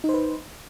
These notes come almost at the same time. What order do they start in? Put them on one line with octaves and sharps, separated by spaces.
D#4 C5 B4